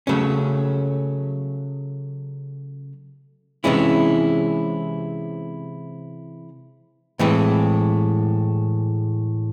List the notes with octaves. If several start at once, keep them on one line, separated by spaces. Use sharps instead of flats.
C#3 F#3 A3 C#4
C3 E3 G#3 C#4 E4
A2 E3 G#3 C4